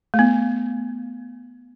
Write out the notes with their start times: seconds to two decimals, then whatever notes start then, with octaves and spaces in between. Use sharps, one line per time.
0.14 A3
0.19 B3